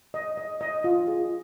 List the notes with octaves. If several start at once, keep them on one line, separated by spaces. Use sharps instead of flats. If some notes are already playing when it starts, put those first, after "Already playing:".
D#5
D#5
D#5
F4
G#4